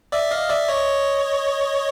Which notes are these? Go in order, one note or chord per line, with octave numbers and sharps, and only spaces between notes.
D5 E5
D#5 F5
D5 E5
C#5 D#5